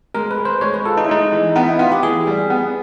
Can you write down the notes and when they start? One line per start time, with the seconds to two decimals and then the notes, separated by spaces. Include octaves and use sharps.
0.14 G#3 A#4
0.31 B4
0.38 G#3
0.45 C5
0.61 G#3 C#5
0.74 B4
0.85 F4 A4
0.97 D#4
1.05 E4
1.09 G#3 D#4
1.32 E3
1.55 B3 D#4
1.68 E4
1.79 B3 F4
1.92 G4
2.03 E3 G#4
2.27 G3
2.50 B3